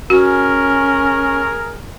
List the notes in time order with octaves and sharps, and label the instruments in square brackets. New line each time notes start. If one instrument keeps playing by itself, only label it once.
[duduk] C#4 [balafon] F#4 [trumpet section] G#4 A#4